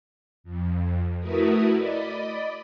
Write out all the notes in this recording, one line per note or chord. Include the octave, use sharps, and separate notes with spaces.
F2
A3 E4 F#4 A#4 B4 D#6
D5 D#5 B5